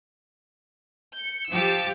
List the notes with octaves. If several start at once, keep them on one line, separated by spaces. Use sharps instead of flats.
G6 C#7
F3 G4 E6 A6